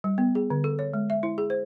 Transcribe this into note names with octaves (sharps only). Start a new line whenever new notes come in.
G3
B3
G#4
D3
A4
C#5
G#3
E5
E4
G#4
C5